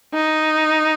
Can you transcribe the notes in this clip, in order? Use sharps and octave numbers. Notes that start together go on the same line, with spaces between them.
D#4